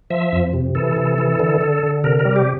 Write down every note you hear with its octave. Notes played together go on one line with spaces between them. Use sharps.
F3 E5
F2
C3
E3 A4
C3
E3
D3
D3
D3
C3 A#4
A#4
G3
G4